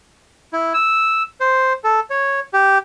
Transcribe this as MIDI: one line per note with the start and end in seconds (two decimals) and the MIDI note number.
0.53 0.73 64
0.74 1.23 88
1.40 1.73 72
1.84 2.00 69
2.10 2.40 73
2.53 2.78 67